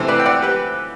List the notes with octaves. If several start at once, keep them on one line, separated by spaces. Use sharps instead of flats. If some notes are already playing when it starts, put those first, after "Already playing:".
Already playing: C3 E3 A3 A4 C5
B4 D5
G5
D5 F#5
G4 B4